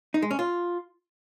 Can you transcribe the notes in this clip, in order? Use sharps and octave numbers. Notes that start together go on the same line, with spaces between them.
D#4
G#3
C#4
F4